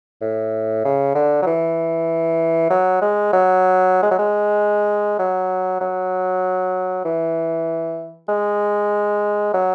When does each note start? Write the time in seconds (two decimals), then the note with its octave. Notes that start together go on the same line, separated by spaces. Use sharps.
0.22 A2
0.85 C#3
1.15 D3
1.42 F#3
1.47 E3
2.70 F#3
3.02 G#3
3.33 F#3
4.03 G#3
4.11 F#3
4.19 G#3
5.19 F#3
5.81 F#3
7.05 E3
8.29 G#3
9.54 F#3